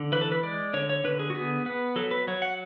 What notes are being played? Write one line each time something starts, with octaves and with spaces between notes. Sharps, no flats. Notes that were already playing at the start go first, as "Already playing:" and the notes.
Already playing: D3
E3 B4
A4
B4
G#3 D5
D3 C#5
C#5
D3 B4
G#4
F#4
B3 G#4
B3 B4
F#3 A4
B4
F#3 C#5
F#5